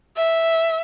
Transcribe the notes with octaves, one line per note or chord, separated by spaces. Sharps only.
E5